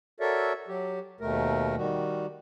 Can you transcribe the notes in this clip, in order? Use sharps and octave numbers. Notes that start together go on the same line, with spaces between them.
F#4 A4 A#4 C#5 D5 E5
F#3 G4
D#2 B2 A3 A#4
D#3 G3 F#4